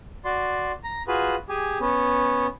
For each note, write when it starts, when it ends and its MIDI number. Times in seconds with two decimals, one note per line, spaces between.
0.25 0.72 66
0.25 0.72 74
0.25 0.72 84
0.84 1.02 82
1.08 1.35 65
1.08 1.35 66
1.08 1.35 68
1.08 1.35 71
1.49 1.79 67
1.49 1.79 68
1.49 1.79 80
1.80 2.47 59
1.80 2.47 61